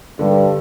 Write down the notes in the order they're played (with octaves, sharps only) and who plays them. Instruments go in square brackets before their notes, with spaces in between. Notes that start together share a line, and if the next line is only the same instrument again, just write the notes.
[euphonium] G2 [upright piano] D3